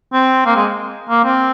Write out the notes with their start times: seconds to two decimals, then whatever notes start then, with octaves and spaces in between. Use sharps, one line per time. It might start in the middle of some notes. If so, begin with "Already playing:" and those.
0.13 C4
0.46 A#3
0.56 G#3
1.09 A#3
1.25 C4